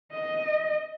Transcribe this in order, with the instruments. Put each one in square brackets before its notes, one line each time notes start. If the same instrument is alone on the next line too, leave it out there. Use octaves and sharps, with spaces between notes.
[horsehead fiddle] D#5